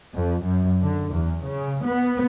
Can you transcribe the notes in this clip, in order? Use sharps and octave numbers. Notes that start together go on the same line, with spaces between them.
F2
F#2
D3
E2
C#3
B3